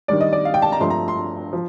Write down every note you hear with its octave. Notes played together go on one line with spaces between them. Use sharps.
D#3 G3 D4 D5
D#5
D5
F5
G5
A5
A#5
G2 F3 A3 C6
A#5
C6
F3